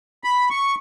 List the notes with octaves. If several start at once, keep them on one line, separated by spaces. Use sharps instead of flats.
B5
C#6